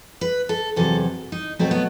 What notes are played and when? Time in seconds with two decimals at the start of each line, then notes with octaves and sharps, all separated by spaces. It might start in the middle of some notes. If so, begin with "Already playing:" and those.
0.21 B4
0.49 A4
0.76 E2 C3 F#3 A4
1.32 D#4
1.59 B2 F#3 A3 C4
1.71 B3